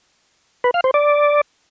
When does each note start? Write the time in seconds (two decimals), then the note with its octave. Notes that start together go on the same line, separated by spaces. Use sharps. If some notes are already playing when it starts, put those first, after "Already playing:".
0.64 B4
0.74 F5
0.84 C5
0.94 D5